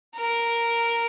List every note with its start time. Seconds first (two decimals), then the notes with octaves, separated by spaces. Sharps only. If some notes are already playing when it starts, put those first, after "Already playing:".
0.16 A#4